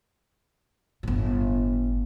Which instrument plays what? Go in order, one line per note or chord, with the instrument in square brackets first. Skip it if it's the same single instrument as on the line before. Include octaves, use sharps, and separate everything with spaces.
[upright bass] G1 A2